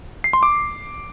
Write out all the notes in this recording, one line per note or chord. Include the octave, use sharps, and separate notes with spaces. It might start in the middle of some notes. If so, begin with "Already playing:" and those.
C7
C6
D6